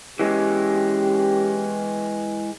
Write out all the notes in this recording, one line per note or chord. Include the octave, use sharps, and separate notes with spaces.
E3 G#3 C#4 G4